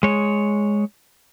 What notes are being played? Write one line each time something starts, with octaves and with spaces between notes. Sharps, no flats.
G#3 C#5